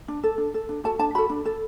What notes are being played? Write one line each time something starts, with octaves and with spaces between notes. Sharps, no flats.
D4
A4
D4
A4
D4
F#4 A4 A5
D4 A5
F#4 A4 B5
D4
A4